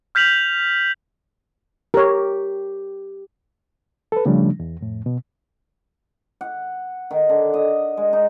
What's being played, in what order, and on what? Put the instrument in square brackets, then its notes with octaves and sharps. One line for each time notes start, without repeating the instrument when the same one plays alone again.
[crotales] F6 G6 B6 F7 F#7
[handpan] G4 [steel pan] A#4 C#5
[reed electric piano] A4 B4
C#3 F3 G3 A3 C#4 D4
E2
F2 A2
B2
[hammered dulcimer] F#5
D#3
D3
D#5
G#3
D#4